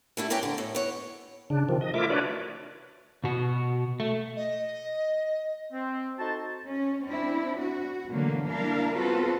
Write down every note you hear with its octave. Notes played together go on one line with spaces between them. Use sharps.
G3 A3 E4
A#4 B4 C#5 D5 G5 G#5
D3
A2
B3 C#5
C#3 D4
C3 D#3 F3
D#5
A3 E4 F4 A#4 E5 D6
D4 F#4 B4 C#5 D5
B2 F#4
A3
D#5
C4
D#4 F#4 A4 C5 A5
C#4
C4 D4 E4
F#4
B2 D3 E3 F#3 A3 A#3
G3 A#3 D4 E4 A#4 F5
B3 C4 F4 F#4 A4 B4